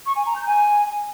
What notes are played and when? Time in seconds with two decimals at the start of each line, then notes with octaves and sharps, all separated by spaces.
0.06 C#6
0.15 G#5
0.25 A#5
0.35 G6
0.45 G#5